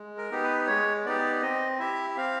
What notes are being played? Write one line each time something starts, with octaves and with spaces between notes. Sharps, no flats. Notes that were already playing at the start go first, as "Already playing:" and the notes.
Already playing: G#3
A#4
B3 D#4 G4
B4
G#3 C#5
B3 D#4 G4 D5
C4 D#5
E4 G4 E5
C4 F5